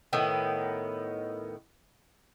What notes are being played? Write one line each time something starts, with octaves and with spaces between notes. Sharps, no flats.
A2 D#3 B3